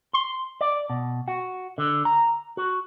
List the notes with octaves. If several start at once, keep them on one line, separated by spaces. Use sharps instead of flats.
C6
D5
B2
F#4
D3
A#5
F#4